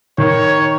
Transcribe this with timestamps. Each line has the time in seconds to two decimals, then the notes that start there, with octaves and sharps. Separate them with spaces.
0.18 D#3 C#5